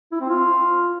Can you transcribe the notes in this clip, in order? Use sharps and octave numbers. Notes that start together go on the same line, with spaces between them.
E4
C4
F4